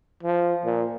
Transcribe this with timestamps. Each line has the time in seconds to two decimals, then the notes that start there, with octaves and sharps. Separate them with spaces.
0.23 F3
0.65 A#2